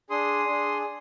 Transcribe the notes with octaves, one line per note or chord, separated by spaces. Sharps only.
D4 G#4 C6 D#6
D4 G#4